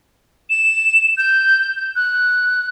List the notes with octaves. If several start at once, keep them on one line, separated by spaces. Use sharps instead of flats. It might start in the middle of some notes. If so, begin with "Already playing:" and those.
E7
G6
F#6